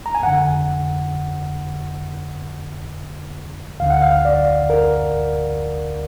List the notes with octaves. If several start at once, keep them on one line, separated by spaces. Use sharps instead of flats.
A#5
G#5
F2 D3 F#5
D2 D3 F5
F#5
F5
D5
A#4